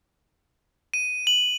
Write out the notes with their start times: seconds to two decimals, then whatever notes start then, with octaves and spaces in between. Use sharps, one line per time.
0.94 D#7
1.27 F#7